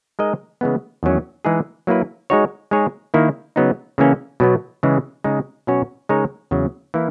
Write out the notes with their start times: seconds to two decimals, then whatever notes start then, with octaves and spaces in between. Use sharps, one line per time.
0.19 G#3 D#4 A#4 D#5
0.61 C#3 E3 G#3 B3
1.03 E2 D#3 F#3 C#4
1.45 E3 G#3 D#4 G#4
1.87 F#3 A#3 E4 B4
2.30 G#3 D#4 F#4 C#5
2.71 G#3 D#4 G#4 C#5
3.14 D#3 A#3 E4
3.56 C#3 F#3 B3 D#4
3.98 C#3 E3 A#3 C#4
4.40 B2 F#3 B3
4.83 C#3 E3 G#3
5.24 C#3 G#3 D#4
5.67 B2 F#3 C#4 F#4 C#5
6.09 C#3 G#3 D#4 A#4 C#5
6.51 E2 C#3 F#3
6.94 E3 A#3 E4 A#4